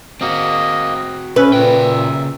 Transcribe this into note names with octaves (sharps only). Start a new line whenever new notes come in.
A#3 C4 F#4 D#5
C#4 B4 E5
A#2 C#3 G5